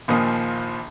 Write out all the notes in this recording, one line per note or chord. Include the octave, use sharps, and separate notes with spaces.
A#1 D#2 A#2 F3 D#6